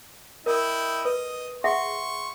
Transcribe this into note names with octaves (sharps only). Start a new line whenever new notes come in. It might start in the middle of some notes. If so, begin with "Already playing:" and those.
E4 A#4 D#5 G5
B4 D#5
G#4 E5 F#5 C6 C#6